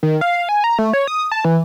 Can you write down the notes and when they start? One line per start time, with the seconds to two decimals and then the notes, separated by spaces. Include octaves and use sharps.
0.03 D#3
0.21 F5
0.49 G#5
0.64 A#5
0.79 A3
0.93 C#5
1.08 D#6
1.32 A5
1.45 E3